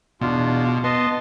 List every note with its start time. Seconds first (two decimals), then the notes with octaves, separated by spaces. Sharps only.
0.21 E2 B2 D4 F4
0.84 B3 D#5 A5 C6